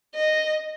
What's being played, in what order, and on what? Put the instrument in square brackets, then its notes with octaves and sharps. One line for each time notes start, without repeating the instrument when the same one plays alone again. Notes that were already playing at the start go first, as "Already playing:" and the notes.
[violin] D#5